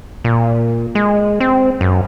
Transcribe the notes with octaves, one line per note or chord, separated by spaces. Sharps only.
A#2
G#3
C4
F#2